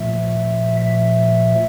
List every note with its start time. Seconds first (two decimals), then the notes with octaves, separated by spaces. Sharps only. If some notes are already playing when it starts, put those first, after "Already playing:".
Already playing: A#2 F3 A3 E5
0.80 E5